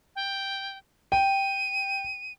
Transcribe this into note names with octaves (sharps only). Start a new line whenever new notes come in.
G5
G5 D#7